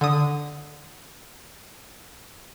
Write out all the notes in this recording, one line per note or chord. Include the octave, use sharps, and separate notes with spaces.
D3 D#6